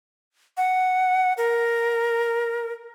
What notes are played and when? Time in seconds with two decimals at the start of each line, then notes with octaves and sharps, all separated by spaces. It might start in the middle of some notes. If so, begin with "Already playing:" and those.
0.57 F#5
1.37 A#4